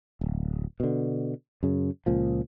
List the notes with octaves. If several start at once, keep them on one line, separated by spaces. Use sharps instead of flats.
D1
B2 D3
F#2 C#3
C#2 A#2 F3